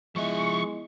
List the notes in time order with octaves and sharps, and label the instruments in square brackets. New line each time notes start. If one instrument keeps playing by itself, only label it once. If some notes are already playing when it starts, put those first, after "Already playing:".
[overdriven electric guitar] F3 E5 [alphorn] G#3 [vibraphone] B3 E4 D#5 [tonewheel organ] C#6